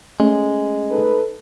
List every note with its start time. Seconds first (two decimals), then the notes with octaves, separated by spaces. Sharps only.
0.20 G#3 A3 C#4
0.90 D#4 A4 B4